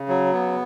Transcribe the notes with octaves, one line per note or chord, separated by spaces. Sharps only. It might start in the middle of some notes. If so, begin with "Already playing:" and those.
Already playing: C#3
F#3
B3